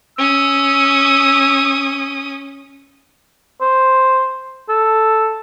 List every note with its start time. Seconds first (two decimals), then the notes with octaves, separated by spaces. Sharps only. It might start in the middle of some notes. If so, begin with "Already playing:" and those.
0.18 C#4 D#6 E6
3.61 C5
4.69 A4